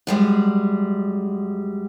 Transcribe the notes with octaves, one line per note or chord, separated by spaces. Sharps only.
F#2 G3 G#3